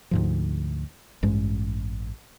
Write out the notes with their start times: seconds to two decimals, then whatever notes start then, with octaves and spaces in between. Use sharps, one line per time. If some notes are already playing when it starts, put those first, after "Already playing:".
0.11 D2 G#2 F3
1.23 A1 G2 G#3